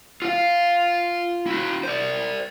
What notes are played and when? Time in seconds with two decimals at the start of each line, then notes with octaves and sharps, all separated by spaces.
0.22 F4 F5
1.47 E4 F#4
1.83 C5 D5